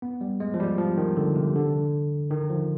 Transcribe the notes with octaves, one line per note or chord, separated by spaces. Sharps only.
B3
G3
G#3
F3
G3
F3
D#3
D3
C3
D3
D#3
F3